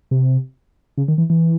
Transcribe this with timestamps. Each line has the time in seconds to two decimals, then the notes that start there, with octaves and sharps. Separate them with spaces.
0.11 C3
0.98 C#3
1.08 D#3
1.18 E3
1.30 E3